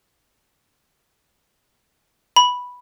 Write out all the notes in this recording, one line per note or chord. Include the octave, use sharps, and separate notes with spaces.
B5